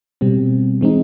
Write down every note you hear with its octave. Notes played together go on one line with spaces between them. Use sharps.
B2 G3 C4
E3 G#3 C4 D#4